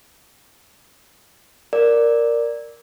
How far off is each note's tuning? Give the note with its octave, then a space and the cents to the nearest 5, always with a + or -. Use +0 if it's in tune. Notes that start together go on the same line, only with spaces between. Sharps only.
A#4 +0 D5 +0